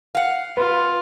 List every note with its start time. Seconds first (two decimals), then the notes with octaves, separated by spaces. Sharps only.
0.15 F5 F#5
0.57 F4 B4